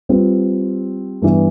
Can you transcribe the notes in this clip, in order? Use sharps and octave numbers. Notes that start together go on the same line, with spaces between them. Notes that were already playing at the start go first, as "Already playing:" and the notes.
G3 C4 F4 B4
G2 E3 B3